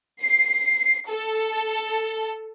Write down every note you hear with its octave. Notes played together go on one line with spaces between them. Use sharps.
C7
A4